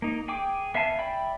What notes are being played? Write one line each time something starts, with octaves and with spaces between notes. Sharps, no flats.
A#3 D#4
G#4 G5 D6
B3 E5 F5 G#5 A5
D5 E5 G5 B5